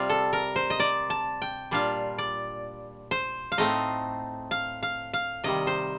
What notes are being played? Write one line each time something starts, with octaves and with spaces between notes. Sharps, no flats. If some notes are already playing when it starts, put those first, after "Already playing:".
Already playing: C3 G3 C4 F4 F5
A4
A#4
C5
D#5
D5
A5
G5
A#2 G3 D4 F4 F5
D5
C5
F5
A2 A3 C4 D#4 D#5
F5
F5
F5
C3 D#3 G3 D#5
C5